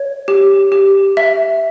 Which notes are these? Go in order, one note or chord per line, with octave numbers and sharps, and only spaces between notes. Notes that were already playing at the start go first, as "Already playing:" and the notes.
Already playing: C#5
G4
G4
E5